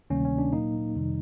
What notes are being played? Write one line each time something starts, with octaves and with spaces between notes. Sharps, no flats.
D2 C3 D#3 G3 A#3 C#4
C#4
D4
A#2 F#3 A#3 D#4
F2 C3 D#3 G3